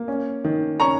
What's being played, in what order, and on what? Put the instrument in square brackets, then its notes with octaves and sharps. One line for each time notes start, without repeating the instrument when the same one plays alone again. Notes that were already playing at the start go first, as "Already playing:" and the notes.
Already playing: [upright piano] A#3
C#4
D#3
C#4 A#5 C#6